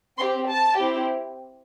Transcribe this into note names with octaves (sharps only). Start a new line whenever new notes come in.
C4 G4 C6
A5
C4 E4 G4